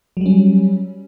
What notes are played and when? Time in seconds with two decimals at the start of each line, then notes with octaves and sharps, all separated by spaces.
0.17 F#3
0.21 G3
0.26 C#4